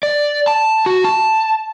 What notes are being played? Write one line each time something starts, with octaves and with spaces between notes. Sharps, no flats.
D5
A5
F#4
A5